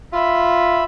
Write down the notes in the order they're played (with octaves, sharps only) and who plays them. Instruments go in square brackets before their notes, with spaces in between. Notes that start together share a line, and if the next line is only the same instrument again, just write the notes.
[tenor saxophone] F4 [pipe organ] E5 B5